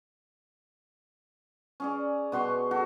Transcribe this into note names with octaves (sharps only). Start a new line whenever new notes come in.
C#4 G#4 D5
B2 F#4 C6 C#6
F#4 A4